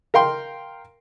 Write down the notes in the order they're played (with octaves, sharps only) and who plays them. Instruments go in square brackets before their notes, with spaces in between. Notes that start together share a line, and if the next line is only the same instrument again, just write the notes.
[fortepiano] A#4 F5 G5 C6